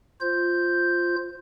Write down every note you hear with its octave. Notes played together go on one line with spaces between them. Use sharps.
F4 C5 G6